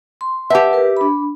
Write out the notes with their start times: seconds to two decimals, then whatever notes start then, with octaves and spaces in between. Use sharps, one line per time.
0.21 C6
0.50 G4 B4 E5 F#5 A5
0.73 A#4 B4
0.97 D4 B5